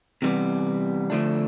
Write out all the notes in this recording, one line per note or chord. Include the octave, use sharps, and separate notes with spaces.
C3 E3 G3 B3
D3 F3 A3 D4